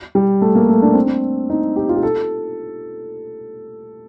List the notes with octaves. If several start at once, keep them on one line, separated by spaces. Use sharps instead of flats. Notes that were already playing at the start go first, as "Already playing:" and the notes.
G3
A3
A#3
G3
A3
D4
C4
D4
D#4
G4
F4
G4
A4